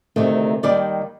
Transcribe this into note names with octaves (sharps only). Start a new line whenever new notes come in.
D2 C3 D#3 A3
D#2 D#3 G3 D5